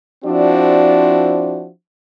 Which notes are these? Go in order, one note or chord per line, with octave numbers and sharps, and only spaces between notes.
F3 C4 D4 E4 F#4 D5